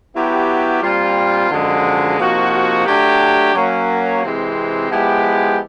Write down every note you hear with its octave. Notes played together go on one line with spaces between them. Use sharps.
F#3 B3 E4 G4
A#2 G3 C4 F4
F#2 D3 F3 G#3
C3 F3 A#3 D#4 F#4
F#3 A3 D4 G4
F#3 A#3 C#4
C3 E3 G#3 C4
F3 G#3 B3 E4 G4